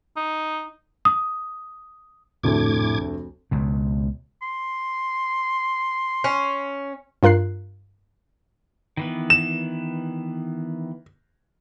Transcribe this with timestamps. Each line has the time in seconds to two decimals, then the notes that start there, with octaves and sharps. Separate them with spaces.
0.17 D#4
1.05 D#6
2.44 F1 D2 A2 A3 D6 G#6
3.51 C#2 B2
4.42 C6
6.24 C#4
7.23 G2 F4 A#4 F#6 C7
8.97 D#3 E3 B3
9.30 E7